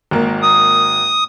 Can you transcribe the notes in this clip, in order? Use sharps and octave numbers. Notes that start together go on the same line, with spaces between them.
G#1 A#3
D#6